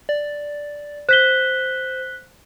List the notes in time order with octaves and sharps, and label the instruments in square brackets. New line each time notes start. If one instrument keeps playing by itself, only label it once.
[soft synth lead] D5
[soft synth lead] C5 [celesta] F#6 B6 G7